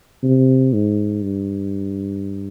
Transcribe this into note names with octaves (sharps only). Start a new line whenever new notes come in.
C3
G#2
G2